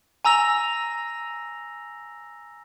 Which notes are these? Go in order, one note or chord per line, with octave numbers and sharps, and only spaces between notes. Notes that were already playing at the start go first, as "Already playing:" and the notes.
G#5 A#5 E6 A#6 F7